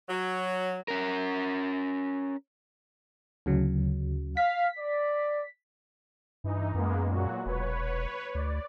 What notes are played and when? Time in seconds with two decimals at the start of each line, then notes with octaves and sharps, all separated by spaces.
0.09 F#3
0.88 C#4 A#4
3.46 D2 C#3 F#3
4.37 F5 B6
4.78 D5
6.44 G2 E3 D#4
6.74 F#2 G#3 A#3 B3
7.10 A#2 F#3 F#4
7.46 E1 B4 C#5
8.35 D2 D5